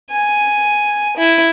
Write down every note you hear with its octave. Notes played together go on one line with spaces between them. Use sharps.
G#5
E4